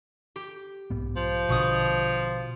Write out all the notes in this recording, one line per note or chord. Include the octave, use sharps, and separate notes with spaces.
G4
B1 G#2 B3
F3
A#1 B2 D3 C#6 D#6